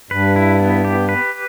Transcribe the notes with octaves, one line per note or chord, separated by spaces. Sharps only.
G2 B4
E4
B3
G4
B4